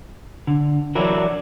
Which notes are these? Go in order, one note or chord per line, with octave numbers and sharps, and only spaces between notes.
D3
E3 F#3 D4 E4 F#4 A#4